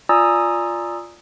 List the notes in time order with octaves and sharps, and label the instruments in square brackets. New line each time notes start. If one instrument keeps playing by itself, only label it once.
[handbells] F4 D5 G#5 A#5 D#6 E6